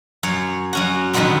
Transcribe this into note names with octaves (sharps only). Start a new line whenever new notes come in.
F#2 C#5
F#2 C#4 F#4
D3 D#3 F#3 G3 B3 C4